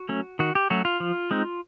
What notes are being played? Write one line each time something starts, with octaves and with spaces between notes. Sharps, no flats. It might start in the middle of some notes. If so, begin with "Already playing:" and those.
Already playing: F#4
F#3 A3 C#4
D#3 F#4
G4
F#3 A3 C#4 F#4
F4
F3
G#3 C4 D#4